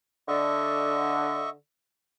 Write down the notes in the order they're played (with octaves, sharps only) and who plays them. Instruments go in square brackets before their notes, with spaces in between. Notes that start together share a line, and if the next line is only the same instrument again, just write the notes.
[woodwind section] D3 [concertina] D#5 E5 C#6